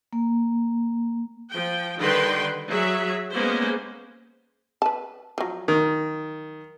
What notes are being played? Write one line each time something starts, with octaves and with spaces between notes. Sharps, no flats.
A#3
F3 G5
D3 D#3 G3 B4 G5 C6
F#3 G#4 E5
G#3 A#3 B3 C#4 C5
B4 A5
F3 F#3
D#3